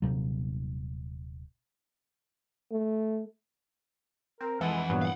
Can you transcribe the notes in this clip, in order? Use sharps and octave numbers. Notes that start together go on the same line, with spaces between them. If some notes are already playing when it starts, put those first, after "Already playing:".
D#1 C2 C3 F#3
A3
C4 A#4
F2 E3 G#3 A4 F#5
G2 A#2 F#3 B3
F5 F#5